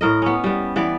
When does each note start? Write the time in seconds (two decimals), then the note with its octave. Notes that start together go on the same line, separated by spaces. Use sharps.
0.01 A2 A#4 D#5
0.22 B3 C#4
0.44 G3 B3
0.76 E3 B3 D5